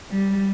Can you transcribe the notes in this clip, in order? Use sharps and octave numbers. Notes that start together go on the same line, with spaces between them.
G3